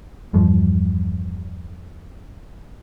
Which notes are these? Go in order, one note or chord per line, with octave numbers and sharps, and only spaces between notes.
E2 G2 F3